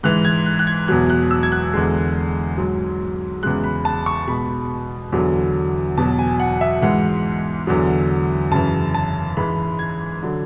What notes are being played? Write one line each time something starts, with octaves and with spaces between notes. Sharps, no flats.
G#2 E3 G#3 F#6
G#6
F#6
F#6
G#6
E2 B2 F#3 F#6
F#6
E6
G#6
F#6
E2 D3 G#3
G#2 F#3
E2 C#3 G#3 F#6
B5
A5
C#6
B2 G#3 B5
E2 D3 F#3
E2 B2 F#3 A5
G#5
F#5
E5
G#2 E3 G#3 F#5
E2 D3 F#3
F#2 C#3 E3 A5
A5
G#2 E3 G#3 B5
G#6
D3 F#3